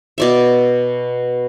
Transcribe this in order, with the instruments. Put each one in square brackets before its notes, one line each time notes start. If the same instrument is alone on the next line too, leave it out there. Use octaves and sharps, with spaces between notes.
[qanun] B2 D5 E5